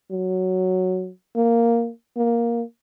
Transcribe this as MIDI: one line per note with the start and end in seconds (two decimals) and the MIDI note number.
0.11 1.10 54
1.36 1.90 58
2.17 2.62 58